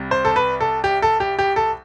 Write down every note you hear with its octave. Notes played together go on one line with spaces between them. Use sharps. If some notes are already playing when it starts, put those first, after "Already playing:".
Already playing: C2 C3 G3
C5
A4
B4
A4
G4
A4
G4
G4
A4